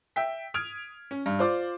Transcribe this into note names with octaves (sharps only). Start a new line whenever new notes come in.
E5 G5 B6
D#6 F6 G#6 D7 F7
C#4
G2
F4 C5 D5 D6